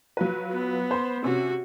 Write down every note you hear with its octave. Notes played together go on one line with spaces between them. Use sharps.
F#3 F4 B4
B3
C5 B5
C3 C#4 F#4